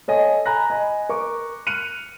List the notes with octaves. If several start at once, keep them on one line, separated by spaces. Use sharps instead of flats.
A4 C#5 D#5 G#5
G#5 A#5 B5 F#6 A#6
D#5 G#5 B5
A#4 C#6 D6
F6 F#6 C#7 D#7 F7